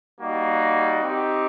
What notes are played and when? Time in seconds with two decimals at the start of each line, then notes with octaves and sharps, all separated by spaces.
0.20 G3 A#3 D#4 F#4
1.03 C4 D#4 G4